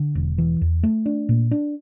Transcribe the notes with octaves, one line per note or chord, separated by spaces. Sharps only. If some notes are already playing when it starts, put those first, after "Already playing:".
Already playing: D3
E1
E3
E2
A3
D4
A#2
D4